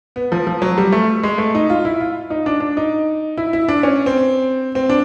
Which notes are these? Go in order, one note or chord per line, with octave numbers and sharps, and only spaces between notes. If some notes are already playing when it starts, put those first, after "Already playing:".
B3
F3
F3
F#3
G3
A3
G#3
A3
D#4
F4
E4
F4
D#4
D4
D4
D#4
E4
E4
D4
C#4
C4
C4
D4